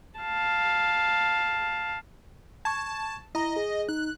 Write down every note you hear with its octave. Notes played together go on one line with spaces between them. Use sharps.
F5 A5
A5 C#6 G#6
E4 D#5 A#5
G#4
D#4 F#6